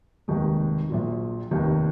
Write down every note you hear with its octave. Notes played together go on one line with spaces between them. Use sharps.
F1 D#2 D#3 G#3
A#1 A#2 F#3
F1 D#2 D#3